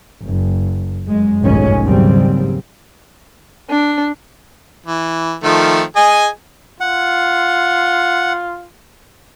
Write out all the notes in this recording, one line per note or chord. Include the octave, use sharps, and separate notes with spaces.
F#1
F#2 G#3
F1 B1 G#2 D#3 G#3 C#4
D#2 G#2 C#3 F#3 G3 C4
D4
E3
D#3 F3 A3
G#4 D#5 G#5
F4 F#5